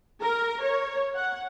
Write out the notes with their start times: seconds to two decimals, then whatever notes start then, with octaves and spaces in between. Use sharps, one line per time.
0.23 A#4
0.63 C#5
1.15 F#5